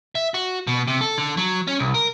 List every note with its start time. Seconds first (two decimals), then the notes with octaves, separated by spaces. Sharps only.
0.15 E5
0.34 F#4
0.67 B2
0.88 C3
1.01 A4
1.18 D3
1.37 F#3
1.67 C#4
1.79 C2
1.94 A#4